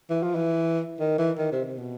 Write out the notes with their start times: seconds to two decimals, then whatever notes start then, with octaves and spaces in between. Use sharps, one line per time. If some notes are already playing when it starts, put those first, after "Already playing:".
0.10 E3
0.23 F3
0.35 E3
1.00 D#3
1.19 E3
1.39 D#3
1.52 C3
1.65 C3
1.78 B2